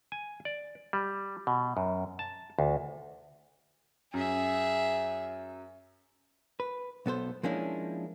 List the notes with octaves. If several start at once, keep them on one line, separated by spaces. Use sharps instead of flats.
G#5
D5
G3
B2
F#2
A5
D2
F#2 G#4 E5
B4
B1 B3 A4 C5
F3 G#3 A#3 C#4 D4 E4